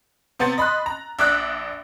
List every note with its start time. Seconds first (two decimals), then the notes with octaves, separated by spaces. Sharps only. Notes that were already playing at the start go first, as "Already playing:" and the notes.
0.39 C3 B3 C4 A6
0.58 D#5 B5 C6 F#6
0.86 A#5
1.19 A#1 D4 E5 D6 D#6 F#6